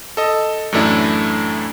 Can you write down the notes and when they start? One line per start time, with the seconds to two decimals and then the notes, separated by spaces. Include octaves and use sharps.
0.17 A4 D#5
0.72 F#2 A2 E3 A3 D4 E4